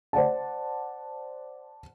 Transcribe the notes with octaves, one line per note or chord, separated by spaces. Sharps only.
C5 D5 F#5 A5